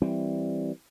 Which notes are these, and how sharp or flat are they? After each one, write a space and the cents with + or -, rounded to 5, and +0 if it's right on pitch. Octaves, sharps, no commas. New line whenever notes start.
E3 +0 G3 +0 C4 +0